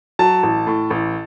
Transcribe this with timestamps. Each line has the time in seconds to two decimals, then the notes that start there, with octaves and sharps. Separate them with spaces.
0.19 F#3 A5
0.43 A1
0.67 A2
0.90 A1